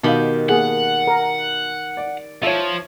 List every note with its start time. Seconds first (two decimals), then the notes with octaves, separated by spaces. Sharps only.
0.03 B2 D#3 G4 F5 B5
0.49 A#3 G#4 F#5
1.07 A#4
1.97 D5
2.43 F3 F4 C#5 E5